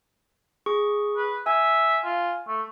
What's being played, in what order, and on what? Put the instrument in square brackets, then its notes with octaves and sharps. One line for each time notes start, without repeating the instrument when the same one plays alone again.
[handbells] G#4 C#6
[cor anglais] B4
[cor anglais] E5 [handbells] G#5
[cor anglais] F4
A3